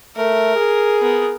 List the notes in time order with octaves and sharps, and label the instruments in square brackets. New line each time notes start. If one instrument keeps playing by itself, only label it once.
[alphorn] A3 [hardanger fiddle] A#4
[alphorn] G#4
[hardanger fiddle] B3 A#4